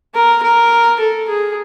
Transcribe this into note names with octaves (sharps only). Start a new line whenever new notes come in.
A#4
A#4
A4
G#4